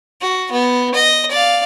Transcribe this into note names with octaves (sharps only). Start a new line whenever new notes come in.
F#4
B3
D#5
D5 F5